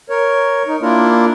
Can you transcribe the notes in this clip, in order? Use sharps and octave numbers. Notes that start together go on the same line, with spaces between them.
A#4 C#5
D#4
A#3 D4 E4 F4 A#4